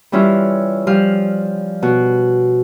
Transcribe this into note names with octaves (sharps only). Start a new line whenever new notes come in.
E3 G3 C#4 E4 F4
F3 G3 F5
B2 F#4